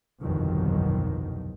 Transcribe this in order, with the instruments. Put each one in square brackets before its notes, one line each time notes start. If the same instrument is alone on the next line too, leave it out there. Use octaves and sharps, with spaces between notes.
[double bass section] G1 C2 F2 B2 D#3 F#3